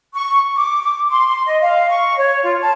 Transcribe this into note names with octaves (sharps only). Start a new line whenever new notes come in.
C#6
D6
D6
C6
D#5
F5
C#6
C#5
F4
A5